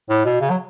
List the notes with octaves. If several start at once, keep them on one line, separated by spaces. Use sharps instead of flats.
A2
B2
C#3
F#3